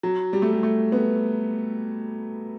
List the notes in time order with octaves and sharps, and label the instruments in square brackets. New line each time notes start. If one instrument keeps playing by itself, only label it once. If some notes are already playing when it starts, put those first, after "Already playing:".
[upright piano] F#3
G3
A3
G3
A3
B3